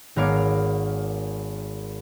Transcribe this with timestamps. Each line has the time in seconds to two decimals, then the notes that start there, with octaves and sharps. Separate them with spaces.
0.16 G#1 B3 A#4 C#5 F5 D6